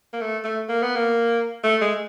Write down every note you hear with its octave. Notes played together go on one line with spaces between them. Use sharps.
A#3
A3
A3
A#3
B3
A#3
A3
G#3